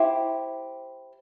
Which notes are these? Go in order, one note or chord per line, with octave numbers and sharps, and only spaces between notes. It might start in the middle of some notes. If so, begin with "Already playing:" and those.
Already playing: E4 G4 C5